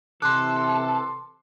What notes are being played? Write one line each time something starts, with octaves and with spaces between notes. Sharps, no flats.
C3 E3 A4 C6 D6 F#6